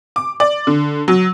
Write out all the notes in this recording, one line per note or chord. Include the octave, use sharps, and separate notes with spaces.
D6
D5
D3
F#3